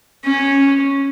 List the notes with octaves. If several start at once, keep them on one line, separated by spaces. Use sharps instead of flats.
C#4